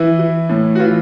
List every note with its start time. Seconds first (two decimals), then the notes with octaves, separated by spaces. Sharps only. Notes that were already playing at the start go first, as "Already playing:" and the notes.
Already playing: E3 E4
0.19 E3
0.49 A2
0.75 F#4
0.79 E3 F4